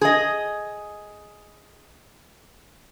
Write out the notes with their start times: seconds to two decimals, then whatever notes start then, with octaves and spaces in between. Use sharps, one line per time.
0.01 G#4 D#5